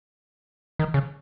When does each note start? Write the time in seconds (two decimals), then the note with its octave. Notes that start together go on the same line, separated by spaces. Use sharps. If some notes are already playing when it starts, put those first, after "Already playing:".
0.79 D#3
0.94 C#3